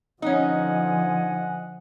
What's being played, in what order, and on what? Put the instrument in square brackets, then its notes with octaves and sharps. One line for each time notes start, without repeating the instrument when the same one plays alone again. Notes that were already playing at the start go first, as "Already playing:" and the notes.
[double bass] D3 F3 [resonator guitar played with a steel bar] C#4 D#4 [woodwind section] D#5 F#5 G#5